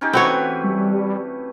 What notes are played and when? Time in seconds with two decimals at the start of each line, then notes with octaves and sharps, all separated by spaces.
0.01 C#4 D#4 G4
0.13 E3 A3 C4 F#4 B4 C#5
0.64 G3